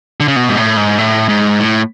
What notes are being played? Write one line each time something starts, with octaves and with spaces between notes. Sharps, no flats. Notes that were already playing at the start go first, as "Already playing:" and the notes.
D3
C#3
B2
G#2
A2
G#2
A2
G#2
A2